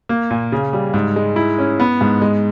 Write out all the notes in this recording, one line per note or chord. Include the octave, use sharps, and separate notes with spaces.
A#3
A#2
C#3
G3
G#2
G#3
E4
C#4
B3
G#2
G#3